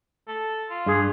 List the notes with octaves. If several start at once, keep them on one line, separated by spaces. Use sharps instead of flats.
A4
F4
G2 G#4